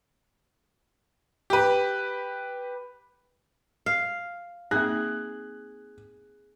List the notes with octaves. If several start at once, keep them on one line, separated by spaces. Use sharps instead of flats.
G4 B4
F5
A#3 C4 D#4 G#4 F#6